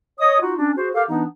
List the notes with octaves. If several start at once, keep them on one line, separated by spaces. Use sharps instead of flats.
C#5 D#5 D#6
D#4 F4 F#4
C#4 D4
F#4 G#4 C5
G4 A4 A#4 F5
E3 B3 D4 D#4